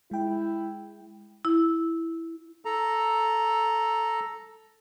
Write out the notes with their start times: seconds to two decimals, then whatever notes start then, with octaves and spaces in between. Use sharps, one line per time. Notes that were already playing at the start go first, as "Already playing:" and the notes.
0.11 G#3 E4 G5
1.45 E4
2.65 A4 A#5